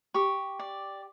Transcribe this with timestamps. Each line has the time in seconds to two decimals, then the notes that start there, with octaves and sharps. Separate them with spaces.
0.14 G4 C#6
0.59 D5